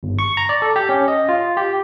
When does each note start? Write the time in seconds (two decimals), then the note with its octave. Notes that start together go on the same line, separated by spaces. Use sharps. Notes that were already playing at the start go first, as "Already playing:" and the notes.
0.03 G1
0.19 C#6
0.37 A#5
0.49 D5
0.62 A4
0.76 G4
0.89 C#4
1.08 D#5
1.29 F4
1.57 G4